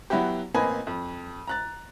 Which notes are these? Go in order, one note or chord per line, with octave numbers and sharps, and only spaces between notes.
F#3 B3 E4 F#4 G4
A1 A#3 C4 B4 D#5 G#5
F2
A#5 F#6 A6